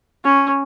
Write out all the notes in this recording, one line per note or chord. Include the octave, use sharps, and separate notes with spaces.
C#4